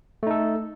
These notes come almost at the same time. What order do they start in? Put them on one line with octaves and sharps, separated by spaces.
A3 D#4 A4